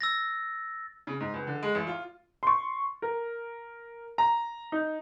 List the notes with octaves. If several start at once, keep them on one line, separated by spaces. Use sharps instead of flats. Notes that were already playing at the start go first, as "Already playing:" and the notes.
E6 A6 A#6
C#3
G#2
C#2
D3
G#3
A1
F4
C6 C#6
A#4
A#5
D#4